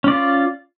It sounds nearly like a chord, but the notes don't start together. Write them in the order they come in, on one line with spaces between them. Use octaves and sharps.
C#4 D5 F4